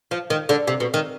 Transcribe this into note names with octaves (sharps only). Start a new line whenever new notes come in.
F3
D#3
D3
C3
B2
D#3